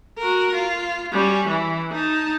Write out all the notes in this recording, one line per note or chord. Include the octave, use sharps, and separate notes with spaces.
F#4 A#4
F4
G3 C#4
E3
D#4 A5